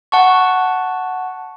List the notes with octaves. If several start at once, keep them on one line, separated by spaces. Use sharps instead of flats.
F#5 A5 C#6